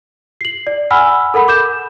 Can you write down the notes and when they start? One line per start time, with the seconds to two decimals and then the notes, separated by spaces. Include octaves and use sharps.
0.41 C7 F#7
0.67 D5
0.91 F#5 G#5 B5 E6 F6
1.34 A4 A#4 F#5 B5
1.48 D6 G6 E7